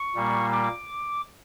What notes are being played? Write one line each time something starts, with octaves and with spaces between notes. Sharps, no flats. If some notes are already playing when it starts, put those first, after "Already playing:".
Already playing: C#6
A#2 G3 A#3
D6